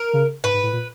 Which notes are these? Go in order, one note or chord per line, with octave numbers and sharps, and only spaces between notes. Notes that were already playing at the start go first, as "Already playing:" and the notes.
Already playing: A#4
C#3
G#2 B4
G#2
A2
A#2